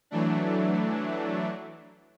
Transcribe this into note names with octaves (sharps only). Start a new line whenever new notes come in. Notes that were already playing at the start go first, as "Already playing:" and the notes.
E3 F#3 A3 D4